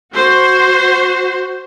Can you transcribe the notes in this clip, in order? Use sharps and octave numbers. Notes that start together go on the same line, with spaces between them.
F#4 C5